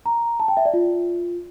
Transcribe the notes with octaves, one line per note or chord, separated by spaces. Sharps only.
A#5
A5
G5
E5
D5
F4